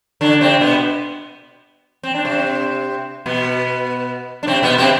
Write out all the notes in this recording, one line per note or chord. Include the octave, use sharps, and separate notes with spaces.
D3 D4
C3 C4
B2 B3
C4
D4
C3 C4
B2 B3
D4
C3 C4
B2 B3
C3 C4